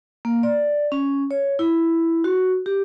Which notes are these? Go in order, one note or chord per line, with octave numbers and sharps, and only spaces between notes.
A#3
D5
C#4
C#5
E4
F#4
G4